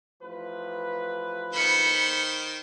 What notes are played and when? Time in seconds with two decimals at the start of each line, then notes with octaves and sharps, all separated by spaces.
0.22 A1 F3 B4
1.53 D#3 C5 B5 C#7